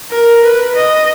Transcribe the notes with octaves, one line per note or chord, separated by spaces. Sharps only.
A#4
B4
D#5